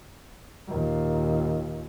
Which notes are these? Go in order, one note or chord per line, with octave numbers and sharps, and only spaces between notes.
D#2 A#2